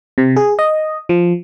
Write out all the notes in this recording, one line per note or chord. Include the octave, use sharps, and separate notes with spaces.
C3
G#4
D#5
F3